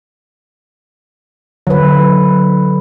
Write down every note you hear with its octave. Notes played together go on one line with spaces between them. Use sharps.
D3 F#3 B4